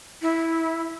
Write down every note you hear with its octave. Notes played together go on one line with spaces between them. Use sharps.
E4